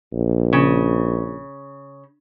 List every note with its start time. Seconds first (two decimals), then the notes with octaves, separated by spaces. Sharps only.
0.13 A#1
0.53 C#3